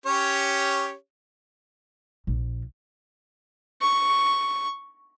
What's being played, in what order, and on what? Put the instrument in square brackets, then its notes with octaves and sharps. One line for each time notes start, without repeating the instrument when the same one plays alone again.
[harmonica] C#4 G4 C#5
[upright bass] A#1
[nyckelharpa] C#6